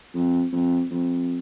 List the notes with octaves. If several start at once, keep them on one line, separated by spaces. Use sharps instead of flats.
F2
F2
F2